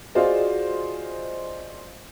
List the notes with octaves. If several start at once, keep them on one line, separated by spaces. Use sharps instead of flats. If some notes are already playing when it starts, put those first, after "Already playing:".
F4 F#4 G#4 C5 D5 D#5